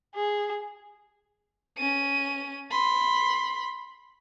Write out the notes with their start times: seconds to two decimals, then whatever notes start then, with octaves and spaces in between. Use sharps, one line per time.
0.15 G#4
1.78 C#4 D#7
2.72 B5 C6